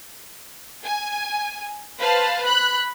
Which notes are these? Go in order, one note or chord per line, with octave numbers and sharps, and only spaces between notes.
G#5
B4 C5 F5 A5
B5 F#6